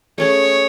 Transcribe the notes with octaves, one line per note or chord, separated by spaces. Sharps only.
A3 C#4 G#4 C#5